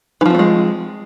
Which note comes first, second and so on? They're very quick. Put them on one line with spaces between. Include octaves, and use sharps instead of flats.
E3 F3 C4 A3 G#3